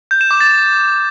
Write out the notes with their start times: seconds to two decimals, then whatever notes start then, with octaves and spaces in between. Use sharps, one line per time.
0.11 G6
0.21 E7
0.31 D6
0.40 A6